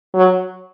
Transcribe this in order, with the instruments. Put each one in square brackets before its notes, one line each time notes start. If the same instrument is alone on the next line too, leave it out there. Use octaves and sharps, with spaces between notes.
[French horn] F#3